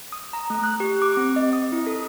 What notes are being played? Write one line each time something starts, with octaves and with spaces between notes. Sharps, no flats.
D#6
A#5
A3
F#6
G4
D6
C4
D#5
D#6
E4
A4